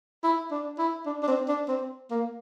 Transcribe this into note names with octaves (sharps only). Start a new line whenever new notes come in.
E4
D4
E4
D4
D4
C4
D4
C4
A#3